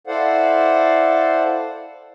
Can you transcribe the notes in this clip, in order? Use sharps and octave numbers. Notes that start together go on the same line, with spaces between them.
E4 A4 C5 D5 F5 F#5